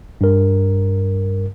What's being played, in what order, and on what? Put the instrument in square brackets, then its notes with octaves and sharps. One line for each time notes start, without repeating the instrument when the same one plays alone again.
[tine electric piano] G2 A#4